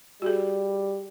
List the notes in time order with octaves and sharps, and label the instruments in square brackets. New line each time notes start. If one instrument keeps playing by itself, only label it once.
[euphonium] G3 [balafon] F#4 G#4